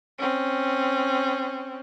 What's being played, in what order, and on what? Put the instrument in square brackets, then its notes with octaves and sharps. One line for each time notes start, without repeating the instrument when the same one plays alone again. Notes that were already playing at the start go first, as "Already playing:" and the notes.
[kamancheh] C4 C#4